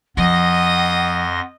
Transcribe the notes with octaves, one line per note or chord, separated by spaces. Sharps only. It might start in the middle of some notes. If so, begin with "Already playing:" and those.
F2 F3 D#5 F#5 C6 D#6 A#6